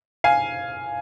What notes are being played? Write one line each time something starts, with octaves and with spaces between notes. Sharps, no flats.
F5 G#5